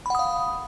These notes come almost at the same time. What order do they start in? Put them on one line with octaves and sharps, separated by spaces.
B5 F#5 D#6 F5